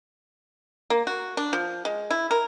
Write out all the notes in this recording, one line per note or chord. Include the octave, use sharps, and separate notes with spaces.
A#3
F#4
D4
F3
G#3
E4
A#4